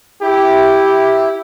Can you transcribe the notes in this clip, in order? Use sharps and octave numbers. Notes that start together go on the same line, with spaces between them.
E4 G4